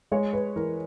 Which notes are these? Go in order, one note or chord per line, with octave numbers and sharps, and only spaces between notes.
G#3 C#5
B4
E3 A#4